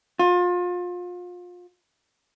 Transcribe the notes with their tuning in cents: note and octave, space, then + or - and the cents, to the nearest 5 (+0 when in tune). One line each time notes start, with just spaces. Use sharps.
F4 +30